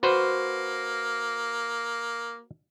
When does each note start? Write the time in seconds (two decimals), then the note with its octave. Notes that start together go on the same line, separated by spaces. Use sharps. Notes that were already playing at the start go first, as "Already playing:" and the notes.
0.03 A#3 F#4 B4 C5